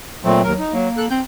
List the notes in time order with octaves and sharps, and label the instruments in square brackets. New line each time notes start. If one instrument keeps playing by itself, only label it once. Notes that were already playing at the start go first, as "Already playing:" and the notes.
[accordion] A#2 A3 C4 [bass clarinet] F#3
[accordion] D#2 A#4
D#4
[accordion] F#3 [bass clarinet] A#3
[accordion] A4 F#6
[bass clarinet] C4 [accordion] G6